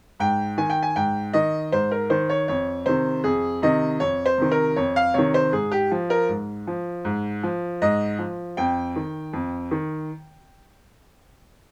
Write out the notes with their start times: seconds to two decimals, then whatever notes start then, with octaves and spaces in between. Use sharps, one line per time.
0.20 G#2 G5
0.58 D#3 G#5
0.70 G5
0.82 G#5
0.96 G#2 G5
1.33 D#3 D#5
1.72 G#2 C5
1.91 A#4
2.10 D#3 C5
2.29 C#5
2.48 F2 C#5
2.86 C3 D#3 C5
3.24 F2 G#4
3.62 C3 D#3 D#5
4.00 F2 C#5
4.26 C5
4.38 C3 D#3
4.51 A#4
4.76 F2 C#5
4.96 F5
5.14 C3 D#3 C#5
5.34 C5
5.53 G#2 G#4
5.71 G4
5.91 F3
6.10 A#4
6.29 G#2
6.67 F3
7.05 G#2
7.43 F3
7.82 G#2 D#5
8.19 F3
8.57 F2 G5
8.96 D#3
9.33 F2
9.71 D#3